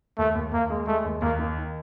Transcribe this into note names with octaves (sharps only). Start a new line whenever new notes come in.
D#2 A3
D#2
D#2 A#3
G#3
G#3 A3
D#2
D#2 A#3
D#3
D#4